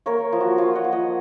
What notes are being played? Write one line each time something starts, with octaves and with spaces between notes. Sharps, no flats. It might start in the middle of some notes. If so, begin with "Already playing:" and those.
A#3 A#4 C#5
F3
F#4
F4 C#5 F5
D#5 F#5
F3
D#5 F#5